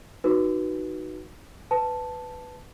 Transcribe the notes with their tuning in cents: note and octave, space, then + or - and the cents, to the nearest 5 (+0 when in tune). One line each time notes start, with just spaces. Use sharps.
D#4 +0 F#4 +0 B4 -20
B4 +10 A5 +0